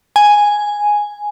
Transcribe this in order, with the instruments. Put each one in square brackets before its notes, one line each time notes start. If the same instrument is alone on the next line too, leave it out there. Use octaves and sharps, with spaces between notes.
[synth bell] G#5